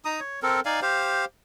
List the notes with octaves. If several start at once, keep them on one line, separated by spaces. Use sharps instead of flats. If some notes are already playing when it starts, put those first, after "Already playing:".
D#4 A#5 D#6
C#5
C4 A4 A#4
D#4 D5 F5 G#5
G4 C5 F5